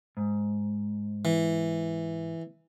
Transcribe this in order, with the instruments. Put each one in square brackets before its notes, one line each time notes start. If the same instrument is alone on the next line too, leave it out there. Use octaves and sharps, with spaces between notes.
[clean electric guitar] G#2
[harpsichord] E3